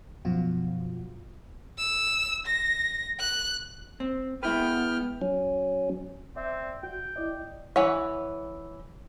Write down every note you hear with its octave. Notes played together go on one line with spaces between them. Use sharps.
F#2 B2 F3 F4 F#4
E6
A#6
F#6
C4
G#3 B3 E4 B4 G5 F6
F#3 C#4
C4 D5 E5
F#4 G5
E4 D5 D#5
E3 C#5 F#5